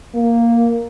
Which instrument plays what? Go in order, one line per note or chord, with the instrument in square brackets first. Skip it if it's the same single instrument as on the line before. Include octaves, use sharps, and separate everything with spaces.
[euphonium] A#3